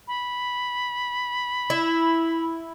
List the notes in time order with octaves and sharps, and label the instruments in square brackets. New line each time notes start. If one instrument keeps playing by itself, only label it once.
[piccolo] B5
[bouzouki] E4